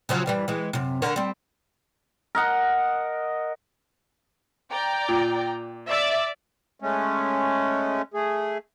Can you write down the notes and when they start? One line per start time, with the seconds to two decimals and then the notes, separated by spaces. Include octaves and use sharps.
0.09 C#3 F3 F#3
0.26 G2 E3 G3
0.48 E3 G#3
0.73 F#2 C3
1.02 D3 A#4 C#5
1.16 G3 C4
2.35 A#4 D#5 F#5
4.71 D5 G5 A#5
5.08 A#2
5.87 D5 E5
6.80 G#3 A3 C#4
8.14 A3 G#4